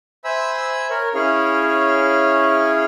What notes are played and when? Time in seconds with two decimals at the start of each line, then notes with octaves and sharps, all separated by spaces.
0.25 C5 E5 G#5 B5 E6
0.90 A#4 C#5
1.15 C#4 E4 G#4 C#5 F5